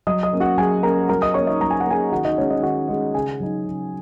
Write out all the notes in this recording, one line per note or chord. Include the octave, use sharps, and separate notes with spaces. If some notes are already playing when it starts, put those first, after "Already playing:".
F#3 D#5 D#6
D#5 D#6
A#3 C#4
F#4 F#5
F#3 G#4 G#5
A#3 C#4 A#4 A#5
F#3 A#4 A#5
D#5 D#6
A#3 C#4 C#5 C#6
D#4 D#5
F#3 A#5
G#5
F#5
A#3 C#4 G#4 G#5
D#3 F#4 F#5
D#4 D#5
G#3 C#4 C#5
D#4 D#5
D#3 F#4 F#5
G#3 C#4
C#3 G#4 G#5
F#3 D#4
C#3